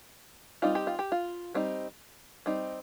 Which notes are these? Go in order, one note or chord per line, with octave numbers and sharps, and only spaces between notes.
G3 C4 D#4 F4
G4
F4
G4
F4
G3 C4 D#4
G3 C4 D#4